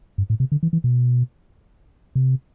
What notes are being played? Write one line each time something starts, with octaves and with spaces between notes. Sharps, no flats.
G2
A2
C3
D3
E3
E3
B2
C3